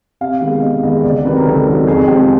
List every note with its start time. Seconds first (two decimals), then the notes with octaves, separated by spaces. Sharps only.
0.21 C3 F5
0.41 D#3 G#3 B3
0.62 C3 D#5
0.83 D#3 G#3 B3 D#5
1.03 C#2 D5
1.24 C3 D#3 F#3 B4
1.37 A#4
1.45 C#2 A4
1.67 C3 D#3 F#3
1.87 F2 G#4
2.07 C3 F3 G#3 G4